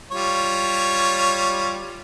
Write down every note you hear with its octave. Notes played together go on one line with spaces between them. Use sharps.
G3 F4 C#5